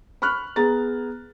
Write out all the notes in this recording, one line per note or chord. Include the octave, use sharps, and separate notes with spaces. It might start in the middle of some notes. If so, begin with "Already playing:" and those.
B5 C#6 F6 F#6
B3 G#4 A#5 A6